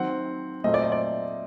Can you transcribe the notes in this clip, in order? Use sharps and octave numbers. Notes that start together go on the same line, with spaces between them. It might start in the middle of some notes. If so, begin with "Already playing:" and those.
Already playing: D#3 F#3 C4 F#5
A#2 F#3 A3 C4 D#5
D5
D#5
D5